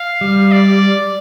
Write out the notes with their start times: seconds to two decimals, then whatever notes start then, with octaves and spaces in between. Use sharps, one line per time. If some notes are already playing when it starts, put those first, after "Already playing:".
Already playing: F5
0.21 G3
0.52 D5